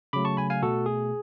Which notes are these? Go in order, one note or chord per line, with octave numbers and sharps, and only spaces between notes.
C#3 F#3 A3 B5 D6
A5 C#6
G#5 B5
F5 G#5
B2 A3 F#4 A4
G#4